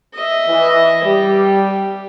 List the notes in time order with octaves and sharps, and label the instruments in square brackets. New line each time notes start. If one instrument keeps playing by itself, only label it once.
[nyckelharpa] D#5 E5
[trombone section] E3
[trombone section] G3 [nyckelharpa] G4